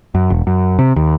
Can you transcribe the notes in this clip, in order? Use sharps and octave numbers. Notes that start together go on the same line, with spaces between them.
F#2
E1
F#2
C3
D#2